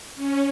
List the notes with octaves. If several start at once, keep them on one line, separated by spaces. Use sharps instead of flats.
C#4